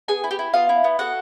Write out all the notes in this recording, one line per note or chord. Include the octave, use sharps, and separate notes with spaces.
B3 G#4 G#5
E4
G4 G5
E4
B3 F4 F5
E4
B3
F#4 A4 F#5